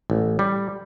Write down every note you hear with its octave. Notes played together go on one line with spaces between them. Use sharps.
A1
G3